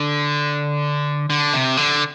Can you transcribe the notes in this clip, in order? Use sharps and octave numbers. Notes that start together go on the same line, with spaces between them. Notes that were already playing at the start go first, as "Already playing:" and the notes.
Already playing: D3
D3
C3
D3